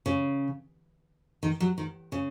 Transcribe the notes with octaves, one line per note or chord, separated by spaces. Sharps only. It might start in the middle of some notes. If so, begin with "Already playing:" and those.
C#3
D#3
F#3
D#3
C#3